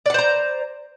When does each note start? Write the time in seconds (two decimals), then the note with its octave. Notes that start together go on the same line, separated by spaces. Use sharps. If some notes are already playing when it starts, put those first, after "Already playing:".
0.06 D5
0.10 F#5
0.14 C5
0.18 A#5